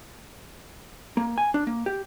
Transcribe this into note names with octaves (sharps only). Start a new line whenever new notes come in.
A#3
G#5
D4
A#3
G4